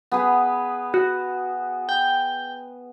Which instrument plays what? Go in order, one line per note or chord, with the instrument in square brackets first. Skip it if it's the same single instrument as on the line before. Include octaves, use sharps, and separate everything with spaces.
[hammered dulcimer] B3 G#4 B4
[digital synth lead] F#4
G5